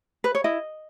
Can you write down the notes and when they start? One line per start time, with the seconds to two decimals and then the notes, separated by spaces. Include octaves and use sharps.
0.24 B4
0.35 C#5
0.44 E4 D#5